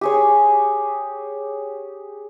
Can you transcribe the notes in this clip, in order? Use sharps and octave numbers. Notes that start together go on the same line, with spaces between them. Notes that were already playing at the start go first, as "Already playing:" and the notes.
G4 G#4 C#5